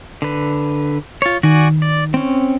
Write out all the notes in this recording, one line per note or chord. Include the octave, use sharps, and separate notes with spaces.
D3 B4
F4 C#5
D#3 F#4 D5 G#5
D5
C4 C#4